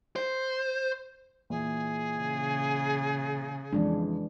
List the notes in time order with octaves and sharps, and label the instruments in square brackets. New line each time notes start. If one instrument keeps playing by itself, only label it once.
[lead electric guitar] C5
[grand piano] A#2 E3 [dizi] G#4
[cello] C#3
[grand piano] F2 [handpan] E3 G#3 D4